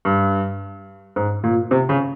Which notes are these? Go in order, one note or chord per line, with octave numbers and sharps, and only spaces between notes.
G2
G#2
A#2
C3
C#3